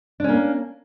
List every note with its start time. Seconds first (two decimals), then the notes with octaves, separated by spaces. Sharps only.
0.20 D4
0.24 C#4
0.29 A#3